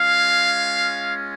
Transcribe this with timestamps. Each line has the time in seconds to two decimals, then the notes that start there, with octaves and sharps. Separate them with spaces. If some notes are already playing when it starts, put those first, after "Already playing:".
Already playing: G#3 C#4 F4 F5